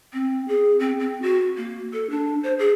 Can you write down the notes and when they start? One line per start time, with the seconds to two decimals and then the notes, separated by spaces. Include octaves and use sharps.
0.13 C4
0.48 G#4
0.79 C4
0.99 C4
1.21 F#4
1.57 A#3
1.93 A4
2.09 D4
2.43 C5
2.58 G#4